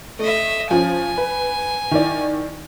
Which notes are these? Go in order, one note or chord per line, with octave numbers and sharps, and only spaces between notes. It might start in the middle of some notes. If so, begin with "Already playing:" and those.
A3 D#5 E5
F3 C#4 G#5
B4
D#3 E4 D5